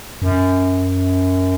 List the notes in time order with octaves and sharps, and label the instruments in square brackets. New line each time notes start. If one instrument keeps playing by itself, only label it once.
[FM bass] F#2